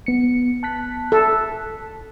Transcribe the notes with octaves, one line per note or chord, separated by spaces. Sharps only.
B3 C#7
A5 F#6 B6
A4